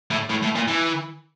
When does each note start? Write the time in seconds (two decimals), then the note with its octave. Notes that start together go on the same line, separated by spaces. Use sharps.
0.11 A2
0.29 A2
0.43 A2
0.55 A#2
0.68 E3